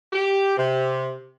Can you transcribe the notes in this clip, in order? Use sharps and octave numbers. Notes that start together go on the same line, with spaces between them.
G4
C3